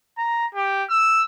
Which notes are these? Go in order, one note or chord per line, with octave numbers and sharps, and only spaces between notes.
A#5
G4
E6